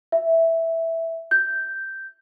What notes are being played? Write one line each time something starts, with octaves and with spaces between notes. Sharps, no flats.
E5
G6